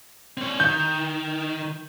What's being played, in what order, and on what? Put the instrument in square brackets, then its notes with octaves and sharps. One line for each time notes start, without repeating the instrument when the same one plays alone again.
[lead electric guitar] C4 C#5
[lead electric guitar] D#3 [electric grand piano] G6